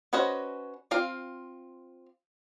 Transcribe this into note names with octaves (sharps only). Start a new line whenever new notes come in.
C#4 F#4 B4 C5 D#5
C4 F4 F5